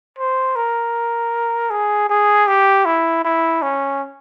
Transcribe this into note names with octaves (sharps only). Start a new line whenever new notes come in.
C5
A#4
G#4
G#4
G4
E4
E4
C#4